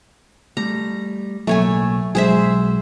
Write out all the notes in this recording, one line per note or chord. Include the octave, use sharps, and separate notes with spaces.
G3 A3 A#5
B1 F#3 A3 A#3 C#5 G#5
B1 F#3 G#3 G#4 C5 E5